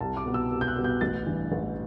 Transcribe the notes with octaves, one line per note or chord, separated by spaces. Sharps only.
C2 A5
D6
B2 G3 B3
E6
C2
G6
F#6
B2 G3 B3
G6
A1 A6
G2 E3
A1